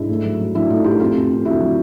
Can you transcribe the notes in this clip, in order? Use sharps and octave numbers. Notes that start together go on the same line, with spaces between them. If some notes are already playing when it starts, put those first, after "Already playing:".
Already playing: G#2 D4 E4
A2
F#3
F#3
F#3 D4 E4
A2 D#4 F4
A2 F4 G4
F2 F4 G4
F2
F2
D3 E4 F#4
F#3